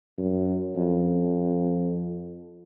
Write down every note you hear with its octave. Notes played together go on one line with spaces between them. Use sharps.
F#2
F2